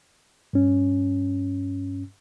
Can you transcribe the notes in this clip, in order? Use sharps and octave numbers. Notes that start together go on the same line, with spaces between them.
G2 C#4